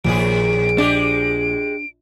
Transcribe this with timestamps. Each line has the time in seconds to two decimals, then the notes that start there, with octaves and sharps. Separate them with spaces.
0.04 A#1 D#2 A2 G#4 D7
0.78 G#3 D4 G4